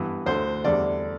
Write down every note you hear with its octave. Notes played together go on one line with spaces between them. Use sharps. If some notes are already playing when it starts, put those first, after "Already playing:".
Already playing: G2 E3 B3
D2 D3 A3 C5
E2 D3 G3 D5